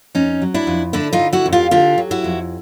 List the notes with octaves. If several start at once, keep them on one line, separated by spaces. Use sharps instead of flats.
F2 C#4 D#4
F#3
D4 E4
F2
D3 D4 E4
D#4 F4
D3
E4 F#4
F2
F4 G4
D3 F4 G4
F#3
E4 F#4
F2